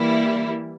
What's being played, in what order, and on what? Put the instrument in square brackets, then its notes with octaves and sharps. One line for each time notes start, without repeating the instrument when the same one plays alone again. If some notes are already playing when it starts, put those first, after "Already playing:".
Already playing: [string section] E3 G3 A#3 E4